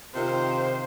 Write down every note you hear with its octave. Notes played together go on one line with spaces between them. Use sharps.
C3 D#3 F4 C5